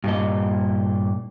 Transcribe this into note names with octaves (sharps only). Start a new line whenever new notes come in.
G2 A#2 D#5